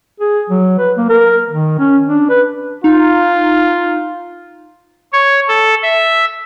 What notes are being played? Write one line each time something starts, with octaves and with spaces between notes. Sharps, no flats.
G#4
F#3
B4
A#3
A#4
D#3
C#4
D4
B4
D#4 F4
C#5
A4
E5